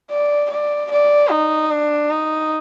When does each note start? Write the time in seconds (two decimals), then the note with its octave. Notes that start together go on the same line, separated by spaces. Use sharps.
0.11 D5
0.50 D5
0.91 D5
1.31 D#4
1.71 D4
2.10 D#4